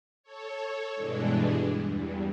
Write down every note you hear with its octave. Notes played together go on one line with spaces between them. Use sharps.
A4 C#5
G2 B2 E3 G#3 D4
E2 G2